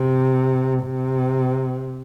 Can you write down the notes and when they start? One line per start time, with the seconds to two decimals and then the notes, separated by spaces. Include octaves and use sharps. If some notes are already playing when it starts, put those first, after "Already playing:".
Already playing: C3
0.84 C3